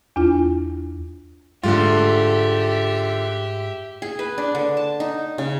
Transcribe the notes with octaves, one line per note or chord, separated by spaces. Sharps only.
E2 D4 F4
G#2 D3 A3 F4 G4 E5
G#4
B4
D4
D3
A5
D#4
C#3